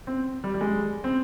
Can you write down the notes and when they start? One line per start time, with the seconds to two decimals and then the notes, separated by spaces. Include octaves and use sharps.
0.07 C4
0.44 G3
0.54 G3
0.61 G#3
1.04 C4